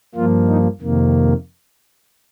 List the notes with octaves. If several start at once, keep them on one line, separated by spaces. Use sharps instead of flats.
G2 F3 A#3 F4
D#4
F2 C3 D#3 A#3